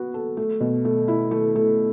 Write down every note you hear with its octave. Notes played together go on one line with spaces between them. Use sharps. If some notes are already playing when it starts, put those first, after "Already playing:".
Already playing: B3 F#4
A4
A3
B2
A3
E4
A3
A3